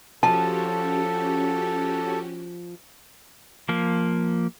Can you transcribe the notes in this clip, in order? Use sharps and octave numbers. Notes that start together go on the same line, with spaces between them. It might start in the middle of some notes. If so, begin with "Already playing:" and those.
F3 C#4 F#4 G4 A4 A5
F3 A#3